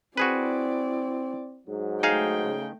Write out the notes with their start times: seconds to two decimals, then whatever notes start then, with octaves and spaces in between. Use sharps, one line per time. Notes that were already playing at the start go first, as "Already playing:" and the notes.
0.17 C4 E4 F#4 G#4 B4 D5
1.68 G#2 F#3
2.03 A3 D#4 G#4 F5 G5
2.44 C#3